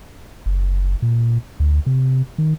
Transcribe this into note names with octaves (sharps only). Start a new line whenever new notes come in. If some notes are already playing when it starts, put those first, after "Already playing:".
F#1
A#2
D2
C3
D#3